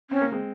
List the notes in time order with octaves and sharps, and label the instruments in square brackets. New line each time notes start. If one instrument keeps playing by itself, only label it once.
[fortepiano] C4 [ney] C#4
[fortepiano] A#3
G#3 C4